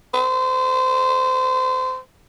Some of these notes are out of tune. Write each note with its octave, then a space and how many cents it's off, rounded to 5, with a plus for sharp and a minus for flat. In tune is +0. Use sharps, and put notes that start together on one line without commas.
C5 -25